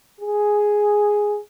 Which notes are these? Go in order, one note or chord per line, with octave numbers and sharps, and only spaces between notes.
G#4